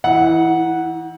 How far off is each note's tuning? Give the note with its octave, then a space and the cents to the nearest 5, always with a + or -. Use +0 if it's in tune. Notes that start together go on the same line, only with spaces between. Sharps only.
E3 +0 D#4 +40 F#5 +0